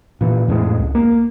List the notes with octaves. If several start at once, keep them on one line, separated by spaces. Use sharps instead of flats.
A#2 E3
F2 A2 G#3
C#2
A#3